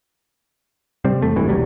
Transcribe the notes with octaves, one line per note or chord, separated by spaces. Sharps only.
C3 G3 C4
E2 A3
G#1 G2 C3 E3
E1 B1 F#3 G3